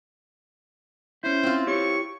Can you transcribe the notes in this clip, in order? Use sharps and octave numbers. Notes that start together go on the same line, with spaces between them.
C#4 E4 C5
C4 F4
E4 G4 C#5 C#6